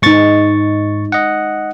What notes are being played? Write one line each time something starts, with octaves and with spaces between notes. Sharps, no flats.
G#2 G#3 D#4 C#6 A6
D#5 F#5